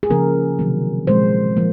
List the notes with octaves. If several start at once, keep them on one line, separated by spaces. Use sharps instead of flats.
G#4
C#3 F3 A#3 A#4
C3 D#3 F#3 A#3
A#2 F3 G#3 C5
F3 A#3